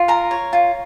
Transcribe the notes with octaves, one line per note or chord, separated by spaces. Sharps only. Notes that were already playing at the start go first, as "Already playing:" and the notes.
Already playing: F4
A#4 A#5
C#5
F4